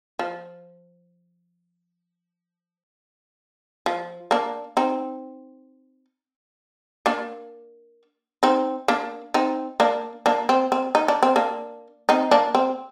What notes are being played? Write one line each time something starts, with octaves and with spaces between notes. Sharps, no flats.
F3
F3
A#3 D4
C4 D#4
A#3 D4
C4 D#4
A#3 D4
C4 D#4
A#3 D4
A#3 D4
C4
C4
D#4
D4
C4
A#3 D4
C4 D#4
A#3 D4
C4